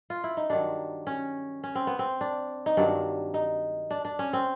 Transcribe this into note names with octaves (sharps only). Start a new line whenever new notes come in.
F4
E4
D#4
G2 D#3 F#3 D4
C#4
C#4
C4
B3
C4
D4
D#4
G2 D#3 F#3 D4
D#4
D4
D4
C#4
C4